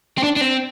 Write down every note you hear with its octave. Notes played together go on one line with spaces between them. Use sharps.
C4
D4
D4
C4